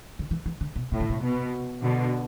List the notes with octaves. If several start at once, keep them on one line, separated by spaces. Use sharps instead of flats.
D3
E3
E3
D3
B2
A2 C3
D3
C3
B2
B2 D3